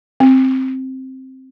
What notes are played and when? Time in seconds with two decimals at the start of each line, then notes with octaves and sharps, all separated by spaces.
0.20 C4